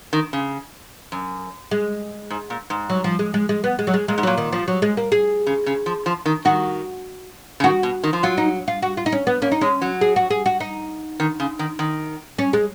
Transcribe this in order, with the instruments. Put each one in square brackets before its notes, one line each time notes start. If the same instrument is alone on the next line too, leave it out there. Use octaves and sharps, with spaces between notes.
[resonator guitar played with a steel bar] D#3
C#3
F#2
[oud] G#3
[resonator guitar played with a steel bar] G#2
A#2
G#2
[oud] F#3
F3
G#3
G#3
G#3
B3
G#3
F#3
G#3
[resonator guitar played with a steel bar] A#2 [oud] G#3
[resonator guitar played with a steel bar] G#2
[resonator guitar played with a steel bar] A#2 [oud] F#3
[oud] D#3
F3
F#3
G#3
A#3
G#4
[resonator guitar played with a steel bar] C#3
C#3
F3
F3
D#3
[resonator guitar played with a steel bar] D#3 [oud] F#4
[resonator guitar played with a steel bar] C#3
[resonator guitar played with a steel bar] D#3 [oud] F#4
[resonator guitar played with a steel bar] B2
D#3
F3
[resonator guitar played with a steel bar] F#3 [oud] F4
[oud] D#4
F4
F#4
F4
D#4
C#4
B3
[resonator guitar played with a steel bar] A#3 [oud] C#4
[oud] D#4
[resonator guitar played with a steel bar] G#3 [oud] C#4
[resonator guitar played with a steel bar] F#3
[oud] G#4
F#4
G#4
F#4
D#4
[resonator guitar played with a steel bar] D#3
C#3
D#3
D#3
[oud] C#4
G#3